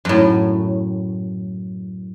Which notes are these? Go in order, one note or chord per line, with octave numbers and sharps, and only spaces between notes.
F#2 A2